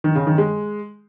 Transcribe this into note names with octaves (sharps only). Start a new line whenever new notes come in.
D#3
C#3
D#3
G#3